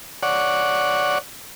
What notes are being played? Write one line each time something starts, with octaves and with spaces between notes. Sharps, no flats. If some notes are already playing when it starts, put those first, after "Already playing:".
C#5 D5 F#5